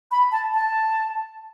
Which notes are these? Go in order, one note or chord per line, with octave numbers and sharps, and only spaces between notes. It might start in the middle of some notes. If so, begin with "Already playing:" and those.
B5
A5
A5